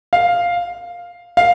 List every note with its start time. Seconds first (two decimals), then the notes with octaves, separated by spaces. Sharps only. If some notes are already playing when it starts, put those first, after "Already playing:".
0.13 F5
1.37 F5